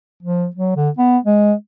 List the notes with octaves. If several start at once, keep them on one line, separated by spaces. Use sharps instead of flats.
F3
F#3
D3
B3
G#3